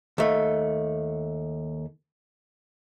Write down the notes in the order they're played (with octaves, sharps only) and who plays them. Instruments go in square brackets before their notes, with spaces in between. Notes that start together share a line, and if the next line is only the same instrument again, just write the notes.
[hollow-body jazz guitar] D#2 A3